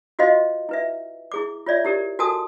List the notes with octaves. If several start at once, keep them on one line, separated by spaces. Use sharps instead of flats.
F4 F#4 C5 D#5 F5
E4 B4 E5
E4 G#4 D6
F4 C#5 D5 E5
E4 G4 A#4 D5
F#4 A4 A#4 G#5 A5 D#6